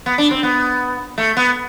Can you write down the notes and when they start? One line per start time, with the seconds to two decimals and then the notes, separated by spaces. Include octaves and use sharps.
0.06 B3
0.18 D4
0.31 C4
0.43 B3
1.18 A3
1.37 B3